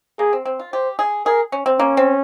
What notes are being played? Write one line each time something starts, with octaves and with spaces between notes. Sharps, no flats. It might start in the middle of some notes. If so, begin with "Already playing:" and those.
A#3 G#4
C4
C4
F4
G4 C5
G#4
G#4 A#4
C#4
C4
A#3 C#4
C4